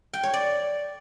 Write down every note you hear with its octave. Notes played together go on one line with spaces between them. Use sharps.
G5
C#5
D5